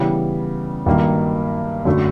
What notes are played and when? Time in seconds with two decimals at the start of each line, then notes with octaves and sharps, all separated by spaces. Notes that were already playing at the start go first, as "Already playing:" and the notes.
Already playing: C#3 E3 G3 B3
0.86 G2 D#3 F#3 A#3
1.85 F#2 D3 F#3 A3